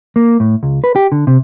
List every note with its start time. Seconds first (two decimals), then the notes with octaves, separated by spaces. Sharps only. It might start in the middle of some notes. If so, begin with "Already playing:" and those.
0.16 A#3
0.40 A2
0.63 C#2
0.84 B4
0.96 G4
1.12 D3
1.27 C3